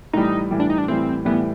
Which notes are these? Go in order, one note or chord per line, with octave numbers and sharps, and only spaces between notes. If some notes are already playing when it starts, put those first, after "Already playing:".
A2 E3 G3 D#4
A2 E3 G3
D4
D#4
D4
A2 E3 G3 C4
A2 E3 G3 B3